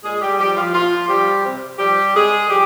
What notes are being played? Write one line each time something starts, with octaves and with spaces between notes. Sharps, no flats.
A#2 G#3 G#4
G3 G4
F3 G3 G4
F3 F4
A#2 F3 F4
F3 G3 G4
C3
F3 G3 G4
C3 G#3 G#4
F3 G3 G4